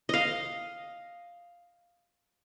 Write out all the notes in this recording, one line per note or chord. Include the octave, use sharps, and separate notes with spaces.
D#5 F5